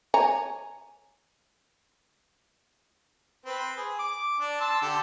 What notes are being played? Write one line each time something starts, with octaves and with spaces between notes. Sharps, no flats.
C#5 G#5 A#5
C4 B4
G#4
D6
D4
A5 C6 E6
D3 G4 A4